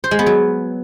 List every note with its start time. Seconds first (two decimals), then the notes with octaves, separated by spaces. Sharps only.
0.04 C5
0.11 G#3
0.19 B3
0.26 F#3